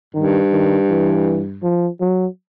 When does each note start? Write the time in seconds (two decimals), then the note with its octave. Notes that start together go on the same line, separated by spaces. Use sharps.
0.14 G2 D#3
0.52 D#3
0.89 E3
1.63 F3
2.00 F#3